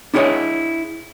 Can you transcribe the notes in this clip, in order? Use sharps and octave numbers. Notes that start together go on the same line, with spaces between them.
D4 E4 G#4 A4 C#5 D#5